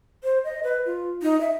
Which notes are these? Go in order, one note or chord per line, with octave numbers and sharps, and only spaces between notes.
C5
D#5
B4
F4
D#4
E5